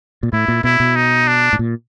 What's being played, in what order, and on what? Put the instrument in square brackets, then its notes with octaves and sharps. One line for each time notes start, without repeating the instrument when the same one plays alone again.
[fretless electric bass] A#2
[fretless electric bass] A2 [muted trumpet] E4
[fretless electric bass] A#2
[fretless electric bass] B2 [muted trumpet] E4
[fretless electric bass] B2
[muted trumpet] D#4
D4
[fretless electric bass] A2
A#2